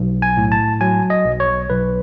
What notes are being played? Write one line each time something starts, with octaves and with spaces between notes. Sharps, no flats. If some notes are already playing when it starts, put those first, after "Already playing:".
Already playing: B1
G#5
A2
A5
F#3 G#5
D#5
B1
C#5
B1 B4